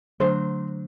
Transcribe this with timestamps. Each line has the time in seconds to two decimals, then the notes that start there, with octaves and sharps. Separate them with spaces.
0.20 D3 F#3 A3 D4 C5